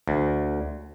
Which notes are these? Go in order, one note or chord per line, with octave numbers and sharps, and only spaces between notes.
D2